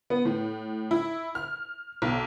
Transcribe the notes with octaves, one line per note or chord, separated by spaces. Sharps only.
B3
A2
E4
F6
B1